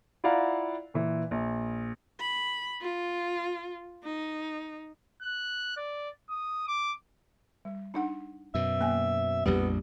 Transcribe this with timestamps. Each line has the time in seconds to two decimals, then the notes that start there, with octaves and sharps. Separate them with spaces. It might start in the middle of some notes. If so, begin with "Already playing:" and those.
0.24 E4 F4 D5 F5 F#5 A#5
0.94 A#2 E3
1.31 A#1
2.20 B5
2.82 F4
4.05 D#4
5.22 F#6
5.77 D5
6.30 D#6
6.68 D6
7.65 G3
7.94 D4 D#4 F#5
8.55 F#2 B2 E5
8.81 A#3 G#5
9.46 A#1 F2 G3 B3 G4